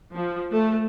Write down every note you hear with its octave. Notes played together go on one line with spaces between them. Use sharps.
F3
A3